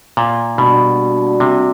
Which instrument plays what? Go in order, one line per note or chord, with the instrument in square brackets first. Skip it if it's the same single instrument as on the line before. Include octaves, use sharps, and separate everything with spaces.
[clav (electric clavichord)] A#2
[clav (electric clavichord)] B2 [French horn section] G3 A#3 D4 F#4
[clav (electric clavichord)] C3